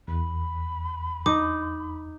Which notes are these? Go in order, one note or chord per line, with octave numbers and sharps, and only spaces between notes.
E2 B5
D#4 D6